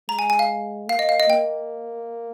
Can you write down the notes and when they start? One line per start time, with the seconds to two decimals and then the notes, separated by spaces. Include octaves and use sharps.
0.09 G#3 A#5
0.19 G#5
0.30 G#5
0.39 F5
0.89 A#3 F5
0.99 D#5
1.09 F5
1.20 D#5
1.30 A#3 G5